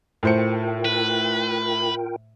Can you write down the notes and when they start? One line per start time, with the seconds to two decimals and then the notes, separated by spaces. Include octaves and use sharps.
0.23 A2 F4 A#4 C5 G5 C#7
0.85 B4